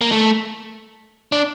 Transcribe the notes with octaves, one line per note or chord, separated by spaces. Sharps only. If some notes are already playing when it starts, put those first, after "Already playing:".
A#3
A3
D4